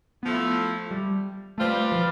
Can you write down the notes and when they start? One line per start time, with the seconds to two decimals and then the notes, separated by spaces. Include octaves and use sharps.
0.23 F3 A3 B3 E4
0.91 G3
1.58 G3 A3 C4 F4 B4 D5
1.92 F3